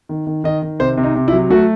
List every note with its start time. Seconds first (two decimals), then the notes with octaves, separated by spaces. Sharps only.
0.09 D#3
0.27 D#3
0.44 D#3 D#5
0.62 D#3
0.79 C3 C5
0.98 C3
1.03 D#4
1.15 C3
1.28 E4
1.33 F#3
1.50 A3 F#4